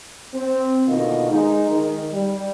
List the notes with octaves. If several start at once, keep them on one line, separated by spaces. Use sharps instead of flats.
C4
B2 D3 D#3 A#3 F4 D#5
G#3 D#4
D#3
G3